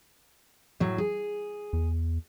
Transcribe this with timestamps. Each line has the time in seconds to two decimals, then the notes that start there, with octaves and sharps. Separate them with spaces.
0.80 A2 F#3
0.98 G#4
1.73 E2